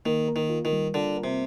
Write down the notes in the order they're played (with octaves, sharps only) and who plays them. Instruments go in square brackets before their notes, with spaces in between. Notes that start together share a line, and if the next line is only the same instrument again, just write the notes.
[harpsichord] D#3 [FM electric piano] A#3
[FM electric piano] A#4
[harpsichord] D#3
[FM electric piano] F4
[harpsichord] D#3
[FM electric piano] G3
[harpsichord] D3 [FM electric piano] F4
[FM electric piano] A#4
[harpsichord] C3